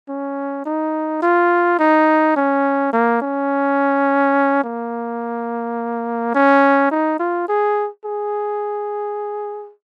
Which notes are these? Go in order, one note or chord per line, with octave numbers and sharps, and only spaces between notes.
C#4
D#4
F4
D#4
C#4
A#3
C#4
A#3
C#4
D#4
F4
G#4
G#4